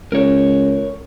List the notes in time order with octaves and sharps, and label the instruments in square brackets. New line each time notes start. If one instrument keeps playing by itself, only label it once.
[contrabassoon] C#2 [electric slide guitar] A#4 C#5